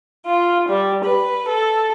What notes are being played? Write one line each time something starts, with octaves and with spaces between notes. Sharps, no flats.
F4
G3
B4
A4